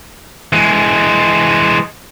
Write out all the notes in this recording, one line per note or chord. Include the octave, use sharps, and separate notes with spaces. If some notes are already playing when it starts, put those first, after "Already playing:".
E3 G#3